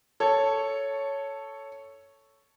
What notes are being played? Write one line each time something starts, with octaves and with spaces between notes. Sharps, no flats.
A4 C#5